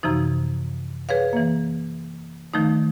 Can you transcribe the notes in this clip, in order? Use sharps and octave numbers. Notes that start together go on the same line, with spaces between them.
F#2 C3 E3 F3 D#4
G#4 B4 C#5 F5
E3 A#3
D#3 F3 A3 D#4